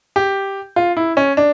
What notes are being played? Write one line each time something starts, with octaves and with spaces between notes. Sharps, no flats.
G4
F4
E4
C#4
D4